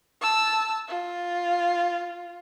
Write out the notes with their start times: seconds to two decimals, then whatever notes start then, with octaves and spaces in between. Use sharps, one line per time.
0.22 A5 E6
0.88 F4